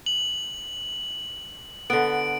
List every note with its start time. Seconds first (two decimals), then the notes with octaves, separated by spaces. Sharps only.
0.06 F#7
1.90 D3 B3 D7